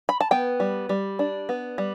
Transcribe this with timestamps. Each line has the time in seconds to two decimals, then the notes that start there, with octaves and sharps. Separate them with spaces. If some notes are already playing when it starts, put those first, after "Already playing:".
0.09 B5
0.20 A5
0.31 B3 G5
0.60 G3
0.89 G3
1.19 D4
1.49 B3
1.78 G3